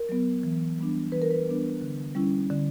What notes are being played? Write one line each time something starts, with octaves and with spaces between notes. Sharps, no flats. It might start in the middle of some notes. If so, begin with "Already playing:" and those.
Already playing: A#4
F#3 B3
E3
G3 B3 D4
E3 B4
A#4
B4
G3 B3 D4
D3
G3 C#4 E4
D3